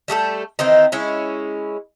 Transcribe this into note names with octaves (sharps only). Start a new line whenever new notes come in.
G3 A3 G#4 A4
D#3 E3 C4 D#4
G#3 C#4 E4